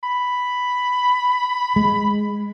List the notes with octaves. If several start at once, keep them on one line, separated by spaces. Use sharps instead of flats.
B5
G#3